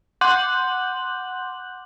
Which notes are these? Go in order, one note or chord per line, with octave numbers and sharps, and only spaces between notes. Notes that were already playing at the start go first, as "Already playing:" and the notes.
F#5 C6 D6 F#6 G6 F#7